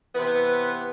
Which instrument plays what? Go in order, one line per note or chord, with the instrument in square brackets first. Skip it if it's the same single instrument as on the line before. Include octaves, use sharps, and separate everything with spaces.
[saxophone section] C3 E3 B3 B4